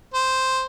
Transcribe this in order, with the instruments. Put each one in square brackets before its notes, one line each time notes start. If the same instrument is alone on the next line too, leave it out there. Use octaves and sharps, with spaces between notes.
[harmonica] C5